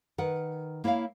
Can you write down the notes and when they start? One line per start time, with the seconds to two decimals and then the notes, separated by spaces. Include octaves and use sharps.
0.18 D#3 A#4 B4 F#5
0.84 A#3 E4 C#5 E5 F5